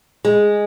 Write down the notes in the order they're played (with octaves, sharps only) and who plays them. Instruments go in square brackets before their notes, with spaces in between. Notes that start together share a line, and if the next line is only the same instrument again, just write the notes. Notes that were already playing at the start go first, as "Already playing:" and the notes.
[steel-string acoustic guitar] G#3